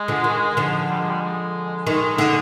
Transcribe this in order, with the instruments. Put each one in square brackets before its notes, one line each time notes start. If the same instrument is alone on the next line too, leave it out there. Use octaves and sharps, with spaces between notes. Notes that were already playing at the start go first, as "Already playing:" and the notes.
Already playing: [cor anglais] G#3
[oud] D3 F3
D#3
D3 F3
[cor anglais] G3
G#3
G3
G#3
[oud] D#3 [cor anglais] G#3
[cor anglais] G#3
[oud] D3